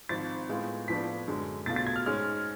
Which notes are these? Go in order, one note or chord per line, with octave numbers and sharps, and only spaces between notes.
G#1 G#2 F3 A6
A2 G#3 B3 F4
A2 F3 B3 D4 B6
F#2 D3 G#3
B1 B2 A3 F4 A6
A6
G#6
F6
G#2 G#3 C#4 F6